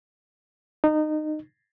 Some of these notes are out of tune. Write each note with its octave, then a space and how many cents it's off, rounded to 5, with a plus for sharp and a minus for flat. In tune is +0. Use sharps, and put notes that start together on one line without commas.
D#4 -25